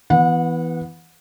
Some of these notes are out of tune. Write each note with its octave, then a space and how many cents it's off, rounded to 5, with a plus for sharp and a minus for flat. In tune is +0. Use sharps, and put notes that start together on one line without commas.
E3 +0 B3 +0 F#5 -35